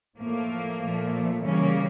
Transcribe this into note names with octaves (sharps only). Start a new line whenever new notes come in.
A2 F3 A3 A#3
A#2 F3 A3
C#3 E3 G3 A#3 C#4